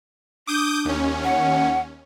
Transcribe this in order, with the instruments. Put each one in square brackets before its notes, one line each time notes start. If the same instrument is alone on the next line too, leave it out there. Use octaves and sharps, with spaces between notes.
[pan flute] D4 [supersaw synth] D6 D#6 G6
[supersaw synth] D#2 C#4
[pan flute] F#5